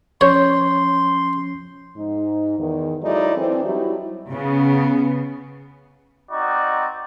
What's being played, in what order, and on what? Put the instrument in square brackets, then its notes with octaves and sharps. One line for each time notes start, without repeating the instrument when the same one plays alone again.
[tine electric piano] F3 C#4 G6 [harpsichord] C#5 [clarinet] C6
[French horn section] G#2 D#4
E2 D#3
F#3 G#3 D#4 E4 A4 D5
E3 C4 D4
F#3 G3 D#4 E4
[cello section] C#3 B3
[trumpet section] C4 D#4 F#4 D5